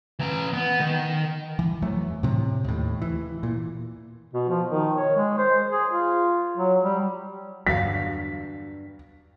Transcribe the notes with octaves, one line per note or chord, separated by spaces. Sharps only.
E3 A#5
B3
D#3
E3
F2 E3 F#3 A3
A2 C3
D#2 A2
E3
A#2
B2
F3
D#3
C#5
G#3
C5
G#4
F4
F#3
G3
E2 G2 D3 F#3 F5 B6